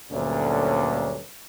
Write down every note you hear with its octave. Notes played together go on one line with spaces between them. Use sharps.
D2 G2 A#2 D3 F#3 C#4